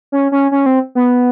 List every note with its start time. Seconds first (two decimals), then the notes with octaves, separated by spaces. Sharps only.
0.12 C#4
0.32 C#4
0.52 C#4
0.66 C4
0.95 B3